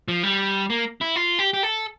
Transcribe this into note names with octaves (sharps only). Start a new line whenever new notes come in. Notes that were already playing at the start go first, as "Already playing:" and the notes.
F3
G3
A#3
E4
F4
G4
G4
A4